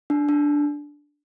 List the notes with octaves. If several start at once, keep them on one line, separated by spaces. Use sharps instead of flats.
D4
D4